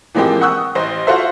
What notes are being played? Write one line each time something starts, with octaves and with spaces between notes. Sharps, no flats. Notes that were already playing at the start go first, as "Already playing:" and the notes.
E3 F3 G#3 A#3 C4 G4
F#5 C#6 D#6 E6 F#6
A1 C5 D#5
F4 F#4 A4 C5 E5